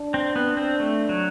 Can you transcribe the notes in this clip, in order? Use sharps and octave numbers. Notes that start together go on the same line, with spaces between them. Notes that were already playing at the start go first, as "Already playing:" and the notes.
Already playing: D4
C4
B3
C4
A3
F#3